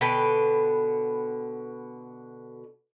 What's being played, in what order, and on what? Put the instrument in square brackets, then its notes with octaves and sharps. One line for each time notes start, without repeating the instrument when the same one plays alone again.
[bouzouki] B2 D3 B4 G5